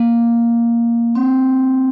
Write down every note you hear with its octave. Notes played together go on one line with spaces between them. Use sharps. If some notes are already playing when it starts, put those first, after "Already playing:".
Already playing: A#3
C4